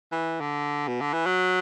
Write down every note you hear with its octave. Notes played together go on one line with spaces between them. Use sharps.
E3
D3
B2
D3
E3
F#3